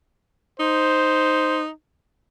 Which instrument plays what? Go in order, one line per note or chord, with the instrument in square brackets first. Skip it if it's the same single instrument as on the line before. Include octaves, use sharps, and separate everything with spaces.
[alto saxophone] D#4 [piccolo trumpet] C5